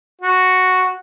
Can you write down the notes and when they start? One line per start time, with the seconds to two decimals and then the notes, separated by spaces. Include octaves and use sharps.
0.21 F#4